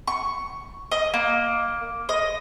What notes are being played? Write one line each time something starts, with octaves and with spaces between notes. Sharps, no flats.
C#6
D#5
A#3
D#5